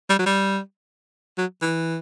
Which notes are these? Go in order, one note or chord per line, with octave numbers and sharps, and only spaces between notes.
G3
F#3
G3
F#3
E3